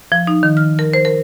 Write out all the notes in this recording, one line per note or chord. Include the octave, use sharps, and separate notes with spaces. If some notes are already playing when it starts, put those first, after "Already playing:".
F3
D#4
D#3
F6
A#4
C5
A#4